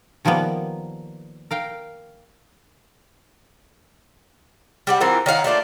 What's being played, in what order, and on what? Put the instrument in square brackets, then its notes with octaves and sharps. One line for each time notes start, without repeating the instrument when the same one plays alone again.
[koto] D#3 F3 G3 A#3 B3
A#4 F5 G5
[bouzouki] G3 G4 F#5
E3 C4 F4 A#4
D#3 C#5 F5 F#5
A3 A#3 D4 F4